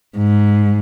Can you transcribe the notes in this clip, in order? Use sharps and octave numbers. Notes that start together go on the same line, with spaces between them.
G#2